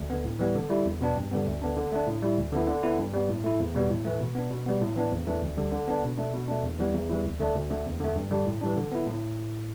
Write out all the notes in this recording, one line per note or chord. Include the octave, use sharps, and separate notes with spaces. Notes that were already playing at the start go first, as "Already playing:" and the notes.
Already playing: D2
D3 B3
A2
E3 G3 B3
D3
G3 E4
E2
B2 B3 D4
G2
D3 G3 B3
D2
D3 B3 D4
D3
A3 D4
A2
G3 E4
D2
D3 B3 E4
D3
B3 E4
G2
G3 B3
A2
A3 E4
E2
B2 G3 B3
A2
E3 A3
B2
B3 D4
B2
G3 B3
A2
E3 B3 D4
E2
E3 A3 D4
D2
D3 G3
D3
B3 D4
B2
A3 D4
B2
A3 D4
E2
E3 G3 B3
E2
E3 G3 E4
D2
D3 A3 D4
D2
D3 A3
E2
D3 A3
G2
D3 G3 D4
A2
E3 G3 D4
D3
B3 E4
A2